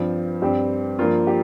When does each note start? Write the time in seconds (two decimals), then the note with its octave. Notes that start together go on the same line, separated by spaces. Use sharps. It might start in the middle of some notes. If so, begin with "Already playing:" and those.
Already playing: G2 F3 C4
0.42 G2 G3 C4 G4
0.99 G2 F3 A#3 F4 A#4
1.27 G4